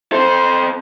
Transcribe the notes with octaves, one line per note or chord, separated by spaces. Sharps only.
C4 A4 C5